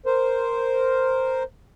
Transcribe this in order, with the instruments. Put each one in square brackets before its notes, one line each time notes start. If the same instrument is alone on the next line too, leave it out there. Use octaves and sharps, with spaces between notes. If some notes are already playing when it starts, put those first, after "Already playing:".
[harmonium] A#4 C5